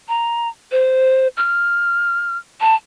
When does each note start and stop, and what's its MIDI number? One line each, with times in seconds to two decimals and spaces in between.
0.08 0.48 82
0.72 1.28 72
1.37 2.37 89
2.61 2.75 81